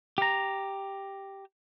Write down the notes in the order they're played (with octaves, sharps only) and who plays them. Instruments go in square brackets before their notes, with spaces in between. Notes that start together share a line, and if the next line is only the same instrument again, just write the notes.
[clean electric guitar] G4 A#5